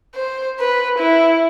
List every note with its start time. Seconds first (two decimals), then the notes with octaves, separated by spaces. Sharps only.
0.15 C5
0.60 B4
0.99 E4